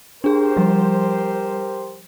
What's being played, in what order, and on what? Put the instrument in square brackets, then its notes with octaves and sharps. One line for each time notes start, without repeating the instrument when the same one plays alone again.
[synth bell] D4 G#4 [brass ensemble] G4 A#4 C5
[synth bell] F3 G3